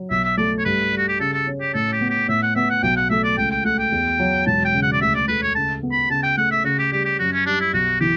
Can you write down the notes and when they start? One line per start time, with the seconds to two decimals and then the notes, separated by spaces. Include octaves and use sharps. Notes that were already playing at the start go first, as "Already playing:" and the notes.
Already playing: F#3
0.10 B1 E5
0.24 E5
0.37 A3 D5
0.58 C#5
0.65 G2 B4
0.92 G3
0.98 F#4
1.09 G4
1.20 C#3 A4
1.33 A4
1.47 C#4
1.61 G4
1.74 A2 A4
1.93 G4
2.01 B3
2.10 G4
2.28 A2 E5
2.43 F#5
2.56 B3 E5
2.70 F#5
2.83 B1 G5
2.97 F#5
3.10 A3 E5
3.24 D5
3.37 C#2 G5
3.51 G5
3.64 A3 F#5
3.79 G5
3.92 E2
4.19 F#3
4.47 E1 A5
4.65 G5
4.74 C#3
4.83 F#5
4.93 D5
5.01 D2 E5
5.15 D5
5.28 A3 B4
5.42 C#5
5.55 C#3 A5
5.83 B3
5.92 B5
6.10 C#3 A5
6.23 G5
6.37 A3 F#5
6.51 E5
6.64 C#3 F#4
6.79 G4
6.92 G3 G4
7.05 G4
7.19 F#2 F#4
7.33 C#4
7.46 G3 D4
7.60 E4
7.74 B1 F#4
8.00 E3 G4